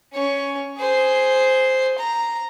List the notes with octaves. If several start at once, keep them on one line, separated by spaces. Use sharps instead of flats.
C#4 C#5
G#4 C5
A#5